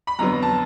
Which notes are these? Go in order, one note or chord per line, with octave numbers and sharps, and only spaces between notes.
B5
F2 D3 F#3 B3 A#5
A5